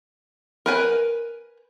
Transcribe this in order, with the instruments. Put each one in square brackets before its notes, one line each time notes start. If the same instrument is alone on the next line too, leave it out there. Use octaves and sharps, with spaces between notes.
[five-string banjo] A#4 B4 G#5